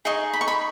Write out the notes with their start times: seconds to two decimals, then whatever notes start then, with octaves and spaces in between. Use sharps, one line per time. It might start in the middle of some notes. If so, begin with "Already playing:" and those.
0.05 D#4 G#4 D#5 C#6
0.33 B5
0.41 C#6
0.48 B5